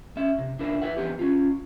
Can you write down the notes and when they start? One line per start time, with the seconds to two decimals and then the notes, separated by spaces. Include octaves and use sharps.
0.17 C#4 E5
0.38 C3
0.59 D4 E4 A#4 C5
0.82 E4 B4 E5 F#5
0.97 E3 B3 C4 G4
1.19 C#4 F4